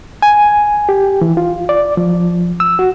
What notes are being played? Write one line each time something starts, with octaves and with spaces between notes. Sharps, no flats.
G#5
G4
E3
F4
D5
F3
E6
F#4